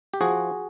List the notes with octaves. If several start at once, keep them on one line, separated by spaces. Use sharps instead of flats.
G4
F3 F#4 G#4